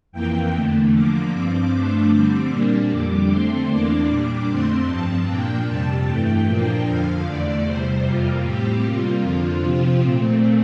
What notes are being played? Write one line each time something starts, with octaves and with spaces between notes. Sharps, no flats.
F2 E3 A#3 G5
E2 D3 A3
D3 F3 A#3 D6
G2 F3 C4 D6
G2 F3 A3 D4
D3 G3 C4
A#2 G3 A#3 D4
F2 D3 G3 D6
D3 A3 C4 C6
E2 E3 A#3 D4 D6
A#2 G3 D4
F2 D3 A3 C4 C6
G2 F3 C4 A5
A#2 F3 A#3 D4 G5
F2 C3 G3 A5
G2 E3 A3 G5
A#2 F3 A#3 D4 G5
F2 D3 F3 F5
E2 D3 A3 D5
E2 C3 G3 C5
F2 C3 G3 A#3 F4
A2 G3 C4 G4
C3 G3 A#3 F4
F2 D3 F3 F4
C3 F3 C4 F4
A#2 A3 C4